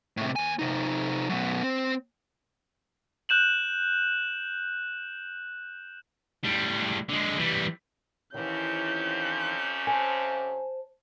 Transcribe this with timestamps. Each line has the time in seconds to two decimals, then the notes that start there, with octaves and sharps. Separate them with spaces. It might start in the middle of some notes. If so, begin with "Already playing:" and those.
0.17 A2 C3
0.36 D#2 G#5
0.59 C3 D#4
1.29 F#2 B2
1.63 C4
3.29 F#6 G6 E7 F#7
6.44 A2 G3
7.09 D3 G#3
7.39 E3 G3
8.34 F2 C3 D#3 E3 C#4 G6
9.87 C5 G#5 A5